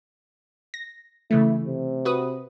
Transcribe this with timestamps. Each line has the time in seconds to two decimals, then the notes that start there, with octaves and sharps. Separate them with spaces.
0.74 A#6
1.31 C#3 E3 A3 E4
1.66 C3
2.05 F#4 B4 D#6